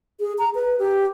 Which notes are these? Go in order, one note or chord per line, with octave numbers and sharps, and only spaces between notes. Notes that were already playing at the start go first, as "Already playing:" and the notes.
G#4
A#5
B4
G4